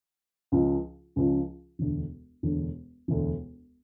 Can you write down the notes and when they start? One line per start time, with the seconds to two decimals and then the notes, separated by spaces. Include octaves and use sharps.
0.52 C#2 C#3 F3 C#4 F4
1.16 C#2 C#3 F3 C#4 F4
1.79 E1 D2 D3
2.43 E1 D2 D3
3.08 E1 D2 D3